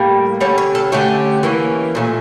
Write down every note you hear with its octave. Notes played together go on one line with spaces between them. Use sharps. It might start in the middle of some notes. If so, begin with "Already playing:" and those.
Already playing: A2 G3 A#3
D3 G3 C#4 C#5
C#5
A4
D3 A3 C#4 G4
E3 A#3 C#4
A#2 A3 C#4